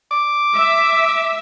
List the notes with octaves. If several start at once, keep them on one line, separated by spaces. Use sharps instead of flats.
D6
E5